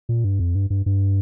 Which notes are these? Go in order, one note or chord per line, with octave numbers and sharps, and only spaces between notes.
A#2
G2
F2
G2
G2
G2